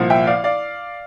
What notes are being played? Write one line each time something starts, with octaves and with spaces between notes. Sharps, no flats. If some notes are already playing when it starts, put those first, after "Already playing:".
Already playing: C2 A#2 F3
E5 G5
D5 F5
D5 F5